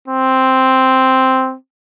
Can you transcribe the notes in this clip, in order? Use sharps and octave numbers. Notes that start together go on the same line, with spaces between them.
C4